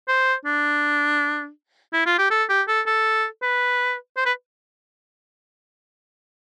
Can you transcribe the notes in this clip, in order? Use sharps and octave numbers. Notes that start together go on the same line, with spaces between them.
C5
D4
E4
F4
G4
A4
G4
A4
A4
B4
C5
B4